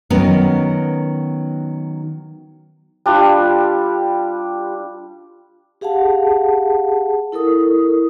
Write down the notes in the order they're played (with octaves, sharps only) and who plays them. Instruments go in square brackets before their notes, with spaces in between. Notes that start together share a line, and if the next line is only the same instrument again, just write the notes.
[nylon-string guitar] D#3 F#3 B3 C#4 A#4
[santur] G3 D4 F4 G4
[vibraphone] G4 G#4 F5 F#5 A5
E4 A4 A#4 D#6